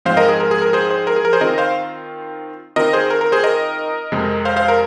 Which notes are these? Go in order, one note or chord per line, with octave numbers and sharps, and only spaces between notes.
G#2 F3 G#3 C4 C5 F5
A#4 D#5
G#4
A#4
G#4
A#4
G#4 C5
G#4 C5
A#4
G#4
A#4
G#4 C5
D#3 C4 F4 A#4 D#5
C5 F5
D#3 C4 F4 A#4 D#5
G#4 C5
A#4
A#4
G#4 C5
A#4 D#5
F2 C3 G#3
C5 F5
C5 F5
A#4